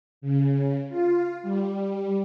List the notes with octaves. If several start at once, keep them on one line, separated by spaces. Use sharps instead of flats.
C#3
F4
G3